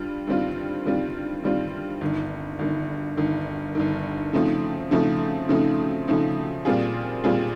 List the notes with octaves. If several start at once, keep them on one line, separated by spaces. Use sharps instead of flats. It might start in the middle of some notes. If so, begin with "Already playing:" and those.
Already playing: G2 G3 F4
G2 D#3 G3 C4 F4
G2 D#3 G3 C4 F4
G2 D#3 G3 C4 F4
G1 G2 D#3
G1 G2 D#3
G1 G2 D#3
G1 G2 D#3
C#3 F3 A3 C4 D#4
C#3 F3 A3 C4 D#4
C#3 F3 A3 C4 D#4
C#3 F3 A3 C4 D#4
A#2 G3 C4 F4 G#4
A#2 G3 C4 F4 G#4